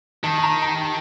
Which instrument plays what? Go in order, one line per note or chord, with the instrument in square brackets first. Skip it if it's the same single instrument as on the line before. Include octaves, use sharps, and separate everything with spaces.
[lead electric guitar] D#3 [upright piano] A5
[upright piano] A5
A#5
A#5
A5